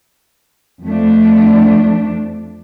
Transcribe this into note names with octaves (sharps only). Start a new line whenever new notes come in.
F2 F3 A3 D4